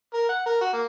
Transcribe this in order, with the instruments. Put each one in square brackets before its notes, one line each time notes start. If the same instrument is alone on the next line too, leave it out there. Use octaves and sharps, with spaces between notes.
[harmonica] A#4
F#5
A#4
F#4
A#3